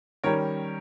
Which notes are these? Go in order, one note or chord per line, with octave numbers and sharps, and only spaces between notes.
D#3 G3 C#4 A#4 C#5